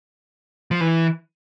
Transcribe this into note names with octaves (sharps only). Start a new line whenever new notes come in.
F3
E3